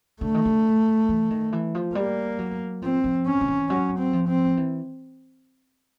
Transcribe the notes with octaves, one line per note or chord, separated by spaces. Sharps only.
D3 A3
D#3
D3
E3
D#3
E3
F3
G3 A#3
F#3
F3 C4
F3
C#4
D#3
E3
F#3 C#4
C4
F3
C4
E3